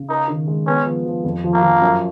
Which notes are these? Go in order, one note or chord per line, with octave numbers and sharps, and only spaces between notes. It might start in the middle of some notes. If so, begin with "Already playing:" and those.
Already playing: C#3
D#4 A#4
D#3
G#3
B3 C#4
F3
F3
F2
F3
A#3
F3
F#2